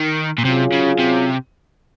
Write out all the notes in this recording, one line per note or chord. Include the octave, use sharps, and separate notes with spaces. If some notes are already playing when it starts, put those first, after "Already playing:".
Already playing: D#3
A#2
C3 F#3 C#4 F4 G#4
C#3
C3